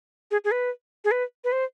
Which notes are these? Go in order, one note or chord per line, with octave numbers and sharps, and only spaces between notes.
G#4
G#4
B4
G#4
B4
B4
C5